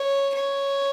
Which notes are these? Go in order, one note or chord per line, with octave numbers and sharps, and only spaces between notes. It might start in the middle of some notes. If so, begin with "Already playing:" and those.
Already playing: C#5
C#5